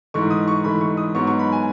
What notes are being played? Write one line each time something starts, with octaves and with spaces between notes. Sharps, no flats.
G#2 E3 A3 C#6
D#6
C#6
G#2 E3 A3 B5
C#6
D#6
G#2 F#3 B3 C#6
C#6
B5
G#5